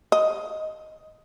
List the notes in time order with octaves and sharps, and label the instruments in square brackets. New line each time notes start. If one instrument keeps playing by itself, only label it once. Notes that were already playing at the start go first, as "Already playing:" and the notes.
[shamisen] D#5